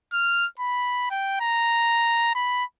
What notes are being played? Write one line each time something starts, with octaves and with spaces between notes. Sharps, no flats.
F6
B5
G5
A#5
B5